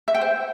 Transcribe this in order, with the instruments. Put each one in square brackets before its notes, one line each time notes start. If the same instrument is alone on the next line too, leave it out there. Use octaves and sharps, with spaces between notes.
[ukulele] E5
G5
C5